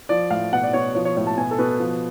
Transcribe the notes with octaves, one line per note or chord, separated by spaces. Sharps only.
F3 D5
A2 F5
B2 F#5
D5
B2 C#5
F3 C#5
C#5
A2 C#5
A5
B2 G#5
A4
B2 B4
F3